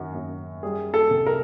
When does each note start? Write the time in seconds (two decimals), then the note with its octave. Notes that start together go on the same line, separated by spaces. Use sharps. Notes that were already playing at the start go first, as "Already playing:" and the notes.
Already playing: F#2 D#3 F#4
0.15 F#2
0.63 G3 G#4
0.94 A4
1.10 C2
1.26 A#4